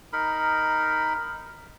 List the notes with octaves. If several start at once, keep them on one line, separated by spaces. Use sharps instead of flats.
D#4 A#4 B5